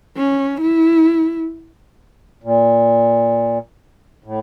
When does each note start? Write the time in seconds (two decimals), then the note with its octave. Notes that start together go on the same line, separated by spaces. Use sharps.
0.17 C#4
0.61 E4
2.44 A#2
4.24 A2